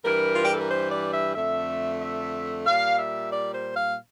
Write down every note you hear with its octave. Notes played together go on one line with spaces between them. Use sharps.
G2 E3 G3 A#4
F4
G4
A4
A#4
C5
D5
E5
F2 D3 A3 E5
E5
A#2 G3 F5
E5
D5
C5
F5